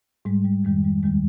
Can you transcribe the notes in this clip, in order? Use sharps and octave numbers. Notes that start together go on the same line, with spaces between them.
G#2 G3 G#3
G3
F2 D#3 G3 G#3
G3
D#2 D#3 G3 G#3